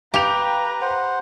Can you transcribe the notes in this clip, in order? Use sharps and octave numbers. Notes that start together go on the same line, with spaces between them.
G4 B4 F5 G5 A#5 F7
C5 F#5